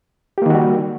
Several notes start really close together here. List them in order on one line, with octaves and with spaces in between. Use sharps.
G4 A#3 D#3 F#4 G3